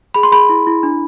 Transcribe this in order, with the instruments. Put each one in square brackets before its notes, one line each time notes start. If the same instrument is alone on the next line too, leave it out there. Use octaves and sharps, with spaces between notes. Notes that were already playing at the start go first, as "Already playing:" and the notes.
[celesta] G#4 B5
C6
G#4 B5
E4
E4
D4